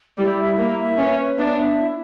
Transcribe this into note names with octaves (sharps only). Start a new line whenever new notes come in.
G3 E4
E5
A#3 E4
E5
C#4 B4
B4
B3 D4 E5
E5
E4